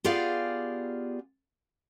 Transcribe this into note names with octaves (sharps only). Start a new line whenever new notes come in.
B3 F4 G4 G#4 D5 F5